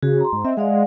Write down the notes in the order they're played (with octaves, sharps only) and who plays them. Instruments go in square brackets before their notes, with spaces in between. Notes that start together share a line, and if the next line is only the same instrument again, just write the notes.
[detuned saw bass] C#3 [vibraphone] F#4 G#4
[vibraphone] A#5 C6
[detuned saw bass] G#2
[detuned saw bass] C4 [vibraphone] D#5 E5
[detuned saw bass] G#3 [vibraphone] D5 F5 F#5